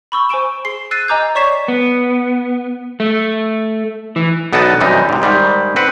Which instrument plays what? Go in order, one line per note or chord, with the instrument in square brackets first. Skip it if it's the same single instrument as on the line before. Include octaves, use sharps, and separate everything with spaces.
[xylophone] B5 C#6 E6 G7
C5 G#5 C#6 D7 E7
G#4 C6 C7
E6 F#6 A6 C7 D#7
D#5 G#5 A#5 D6 D#6 G6
C#5 D5 C#6 B6 C7 E7
[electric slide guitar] B3
A3
E3
[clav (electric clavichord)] B1 B3 D#4 A4 D5 A5
F#2 C3 E3 G3 D#4
G#2 C3
G#2 D#3 G3 G#3
C4 B4 F#5